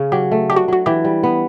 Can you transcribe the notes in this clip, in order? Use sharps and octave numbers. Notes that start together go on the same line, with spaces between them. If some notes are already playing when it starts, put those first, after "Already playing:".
Already playing: C#3 C#4
F#3 G4
A3
D4 G4
F#4
F#3 F#4
E3 G4
G3
B3